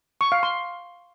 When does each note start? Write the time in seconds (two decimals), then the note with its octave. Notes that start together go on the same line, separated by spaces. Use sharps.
0.21 C#6
0.32 F5
0.43 C6